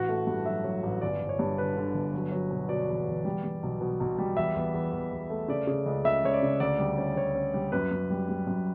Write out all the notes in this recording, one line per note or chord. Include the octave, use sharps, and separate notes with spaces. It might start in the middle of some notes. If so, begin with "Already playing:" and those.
Already playing: A1 F#4
A3
G2
F#3 E5
F#3
A1
G1 D5
G1
C#5
G2
D3 B4
D3
G1
F#3
F#3
B2
B2 D5
E2
E2
G3
G3
B1
B2
B1
G3
E2 E5
E2
E2
E2
E2
A3
C#3 D5
C#3
C#2
C#2 E5
C#2 C#5
D5
C#3
D2 D5
G3
C#4
D2 C#5
C#4
G3
F#2 B4
F#2
G3
G3
F#2